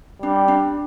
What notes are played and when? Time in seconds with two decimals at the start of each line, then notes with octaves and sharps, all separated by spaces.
0.22 G3 D4
0.48 D4